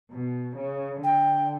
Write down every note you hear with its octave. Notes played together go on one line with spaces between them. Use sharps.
B2
C#3
D3 G5